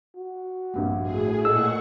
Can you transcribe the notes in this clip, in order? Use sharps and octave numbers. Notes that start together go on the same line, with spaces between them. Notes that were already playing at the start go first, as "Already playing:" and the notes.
F#4
A#1 G2 G3
A2 G#4
A#2 A4 D#5 F#5 C#6 E6